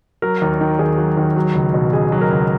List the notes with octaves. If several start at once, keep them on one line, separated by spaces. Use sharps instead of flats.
F#3 A#4
D#2
D#3
D#2 G#4
F#3
D#2
F#3
C#2
B2
C#2 G#4
F#3
A#4
C#2